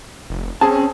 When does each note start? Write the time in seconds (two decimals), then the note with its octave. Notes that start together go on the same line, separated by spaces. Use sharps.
0.30 F1
0.61 C4 C#4 G#4 A5